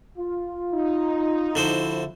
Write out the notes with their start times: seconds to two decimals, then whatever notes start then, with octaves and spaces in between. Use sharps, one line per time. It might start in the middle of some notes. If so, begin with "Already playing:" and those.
0.18 F4
0.74 D#4
1.55 D3 F3 E4 F#4 C5